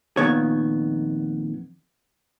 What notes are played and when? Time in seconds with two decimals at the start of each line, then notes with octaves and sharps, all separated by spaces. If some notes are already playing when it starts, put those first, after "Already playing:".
0.17 F2 A#2 D#3 B3 C#5